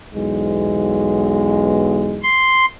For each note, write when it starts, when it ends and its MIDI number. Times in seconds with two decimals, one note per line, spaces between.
0.13 2.29 35
0.13 2.29 40
0.13 2.29 56
2.22 2.65 84